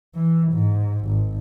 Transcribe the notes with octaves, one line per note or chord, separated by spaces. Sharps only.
E3
G#2
G#1